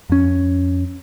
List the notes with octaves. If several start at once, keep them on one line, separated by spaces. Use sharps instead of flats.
F2 C#4